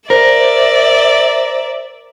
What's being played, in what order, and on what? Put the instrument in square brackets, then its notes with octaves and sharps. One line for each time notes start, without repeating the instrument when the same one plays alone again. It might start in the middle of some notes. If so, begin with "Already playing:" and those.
[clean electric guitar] A#4 [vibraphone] C5 [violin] D5 E5